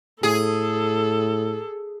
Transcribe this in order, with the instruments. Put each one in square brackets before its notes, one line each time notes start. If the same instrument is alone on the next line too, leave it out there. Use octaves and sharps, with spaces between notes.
[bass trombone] A2 [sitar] G#4 [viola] A4